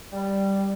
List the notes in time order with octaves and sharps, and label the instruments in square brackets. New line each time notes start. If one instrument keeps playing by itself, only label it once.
[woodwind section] G3